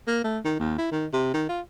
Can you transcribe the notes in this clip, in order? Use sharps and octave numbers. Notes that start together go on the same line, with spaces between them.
A#3
A3
D#3
D#2
E4
D#3
C3
D#3
F4